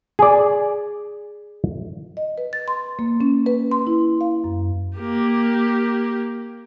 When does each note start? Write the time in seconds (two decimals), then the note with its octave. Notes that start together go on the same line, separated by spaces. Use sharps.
0.19 G#4 D5
2.17 D#5
2.38 B4
2.53 A6
2.68 C6
2.99 A#3
3.21 C#4
3.46 B4
3.71 C6
3.87 E4
4.21 F5
4.44 F#2
4.98 A#3 G4